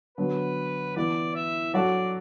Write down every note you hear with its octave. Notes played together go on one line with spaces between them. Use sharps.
D3 F#3 B3 B4
E3 B3 E4 D5
E5
F#3 D4 F#4 A4 D5